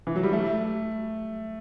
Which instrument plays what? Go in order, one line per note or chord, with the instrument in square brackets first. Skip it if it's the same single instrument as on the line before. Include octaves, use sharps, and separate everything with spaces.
[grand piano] E3
F#3
G3
A3